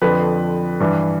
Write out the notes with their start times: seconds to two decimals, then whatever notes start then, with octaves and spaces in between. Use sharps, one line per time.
0.01 F2 D3 F3 B4
0.80 G2 E3